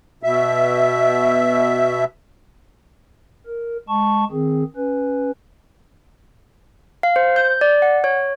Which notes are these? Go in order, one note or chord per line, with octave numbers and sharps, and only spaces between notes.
B2 E5
A#4
G#3 A5 C#6
D#3 C4 G#4
C#4 B4
F5
C5
G6
D5
F#5
C#5